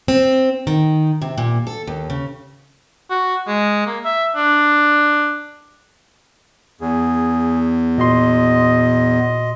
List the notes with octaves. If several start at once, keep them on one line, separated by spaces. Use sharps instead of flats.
C4
D#3
C3
A#2
A4
D#2
C#3
F#4
G#3
A#3
E5
D4
E2 G#4
A#2 F#4 D#5 C6